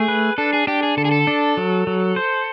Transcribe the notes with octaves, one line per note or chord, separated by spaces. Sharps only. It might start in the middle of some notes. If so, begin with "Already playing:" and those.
Already playing: A3 G#4
B4
D4 A4
G#4
D4 G4
G#4
D3 A4
G#4
A4
D4
F#3
F#3
C5